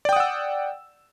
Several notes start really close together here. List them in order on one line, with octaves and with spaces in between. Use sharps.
D5 G5 D#6 F#5 E6